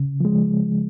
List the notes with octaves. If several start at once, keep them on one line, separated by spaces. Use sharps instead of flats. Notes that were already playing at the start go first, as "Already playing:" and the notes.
Already playing: C#3
F3 G#3